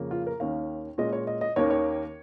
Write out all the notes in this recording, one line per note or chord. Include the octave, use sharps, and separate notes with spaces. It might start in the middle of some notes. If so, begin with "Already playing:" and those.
Already playing: F2 C#3 A#3
F4
A#4
D#2 D#3 C#4 F5
A#2 G#3 C#4 D#5
C#5
D#5
D#5
D#2 D#3 A#3 C#4 C#5
C#5